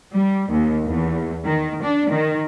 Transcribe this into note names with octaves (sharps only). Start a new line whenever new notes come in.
G3
D#2
E2
D#3
D4
D#3